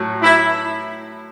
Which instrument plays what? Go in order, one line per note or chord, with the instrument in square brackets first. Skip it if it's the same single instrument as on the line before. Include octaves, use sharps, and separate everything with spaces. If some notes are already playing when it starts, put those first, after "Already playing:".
Already playing: [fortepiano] A2 F#3
[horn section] E4